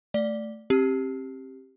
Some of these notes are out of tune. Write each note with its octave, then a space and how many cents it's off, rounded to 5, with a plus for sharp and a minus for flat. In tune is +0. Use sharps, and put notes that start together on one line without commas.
A3 +0 D5 +0
C4 +30 G4 +0